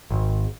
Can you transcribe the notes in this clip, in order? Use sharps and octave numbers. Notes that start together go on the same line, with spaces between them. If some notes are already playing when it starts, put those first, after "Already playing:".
G#1